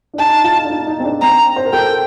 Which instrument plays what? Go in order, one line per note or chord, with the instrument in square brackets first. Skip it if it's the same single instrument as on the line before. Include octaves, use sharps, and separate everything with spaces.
[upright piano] D4
[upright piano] D#4 [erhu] A5
[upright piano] F4
D4
D#4
D#4
C4
D4
[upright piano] C4 [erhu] A#5
[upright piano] C5
A#4
[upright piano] A4 [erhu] G5